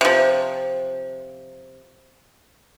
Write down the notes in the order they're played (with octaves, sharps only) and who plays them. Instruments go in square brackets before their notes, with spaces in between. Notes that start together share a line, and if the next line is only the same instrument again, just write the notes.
[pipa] C3 F3